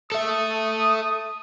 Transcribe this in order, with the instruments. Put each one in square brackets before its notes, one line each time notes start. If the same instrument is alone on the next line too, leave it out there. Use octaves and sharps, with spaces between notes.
[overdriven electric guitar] A4 E5 [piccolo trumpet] D#6